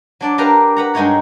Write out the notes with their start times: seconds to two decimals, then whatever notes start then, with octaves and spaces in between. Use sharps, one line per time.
0.21 F#3 D4 D5
0.38 D4 G4 A#4 B4 F5 A#5
0.76 B4 F#5 A#5
0.94 G2 G#3 D#4 F#4 C#5 A#5